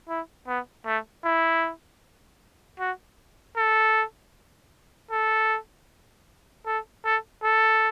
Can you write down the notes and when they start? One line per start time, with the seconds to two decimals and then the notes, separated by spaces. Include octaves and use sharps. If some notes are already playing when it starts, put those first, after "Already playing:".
0.09 E4
0.47 B3
0.86 A3
1.25 E4
2.79 F#4
3.57 A4
5.11 A4
6.66 A4
7.05 A4
7.44 A4